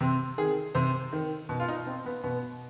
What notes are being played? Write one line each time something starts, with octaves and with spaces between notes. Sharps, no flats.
C3 C4
D#3 G#4
C3 C5
D#3
B2
F4
D#4
C4
B3
B2 B3